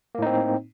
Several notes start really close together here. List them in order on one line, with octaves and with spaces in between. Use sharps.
A#3 A2 D#4 C4